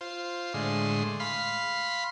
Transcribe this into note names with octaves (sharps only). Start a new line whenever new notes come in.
F4 C5
A2 D3 G#3 C6
F5 B5 C6